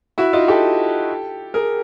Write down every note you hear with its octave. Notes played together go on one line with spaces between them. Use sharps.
E4 F#4
D#4 F4
G4 A4
G#4 A#4